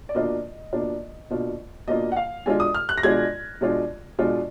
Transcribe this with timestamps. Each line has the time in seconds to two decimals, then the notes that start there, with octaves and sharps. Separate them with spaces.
0.09 D5
0.15 B2 A#3 D4 F4 D#5
0.73 B2 A#3 D4 F4
1.30 B2 A#3 D4 F4
1.88 B2 A#3 D4 F4 D#5
2.12 F#5
2.16 F5
2.46 B2 G#3 D4 F4 G#5
2.60 D#6
2.74 F6
2.89 F#6
2.98 A#6
3.03 B2 G#3 D4 F4 G#6
3.61 B2 G#3 D4 F4
4.19 B2 G#3 D4 F4